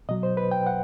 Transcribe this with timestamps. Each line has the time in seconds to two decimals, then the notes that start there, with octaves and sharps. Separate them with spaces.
0.09 B2 F#3 D#5
0.23 C5
0.37 B4
0.51 G5
0.67 F#5